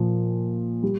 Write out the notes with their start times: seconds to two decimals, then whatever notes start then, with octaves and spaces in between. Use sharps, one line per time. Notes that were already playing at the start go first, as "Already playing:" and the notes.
Already playing: A#2 F3
0.83 G3